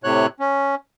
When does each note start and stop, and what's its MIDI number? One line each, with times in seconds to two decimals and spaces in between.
0.04 0.26 45
0.04 0.26 48
0.04 0.26 73
0.04 0.26 90
0.40 0.75 61